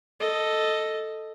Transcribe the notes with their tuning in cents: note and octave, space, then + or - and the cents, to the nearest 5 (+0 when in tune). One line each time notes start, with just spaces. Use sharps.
A4 +0 D#5 +0